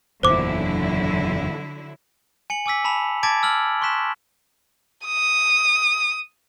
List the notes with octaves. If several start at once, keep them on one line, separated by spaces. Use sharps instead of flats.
F#1 E2 A#2 D3 F#3 E4 C5 D6
G#5 C#7 F#7
G#5 D6 E6 B6
A5 B5 B6 F7
A5 D6 G#6 A6 B6 D7
E6 F6 F#7
C6 C#6 F#6 B6 E7
D#6